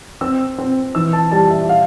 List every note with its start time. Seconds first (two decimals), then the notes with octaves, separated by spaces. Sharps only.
0.21 C4 E6
0.58 C4
0.95 E3 E6
1.13 A5
1.31 G3 A5
1.50 E5
1.69 F5